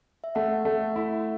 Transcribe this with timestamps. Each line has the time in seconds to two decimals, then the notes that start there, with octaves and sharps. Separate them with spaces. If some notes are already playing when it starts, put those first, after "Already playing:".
0.24 E5
0.35 A3 F#5
0.65 A3
0.96 E4